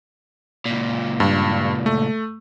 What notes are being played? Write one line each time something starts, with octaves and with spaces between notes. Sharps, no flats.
C#2 A#2
G2
A3